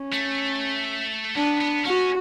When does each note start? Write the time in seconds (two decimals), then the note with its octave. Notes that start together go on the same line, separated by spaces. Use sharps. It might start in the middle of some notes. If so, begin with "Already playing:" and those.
Already playing: C#4
0.13 A3
1.35 B3 D4
1.60 B3
1.84 C#4 F#4